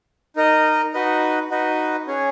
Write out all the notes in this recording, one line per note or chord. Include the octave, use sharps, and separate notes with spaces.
D#4 A#4 D#5
D#4 F#4 B4 D#5
D#4 F#4 B4 D#5
C#4 G#4 C#5